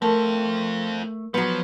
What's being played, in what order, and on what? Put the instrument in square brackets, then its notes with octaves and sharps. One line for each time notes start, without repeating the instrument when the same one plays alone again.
[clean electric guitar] A3 [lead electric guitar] C4 F4 [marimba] A#4 A5
[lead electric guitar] F3 [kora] F#3 B3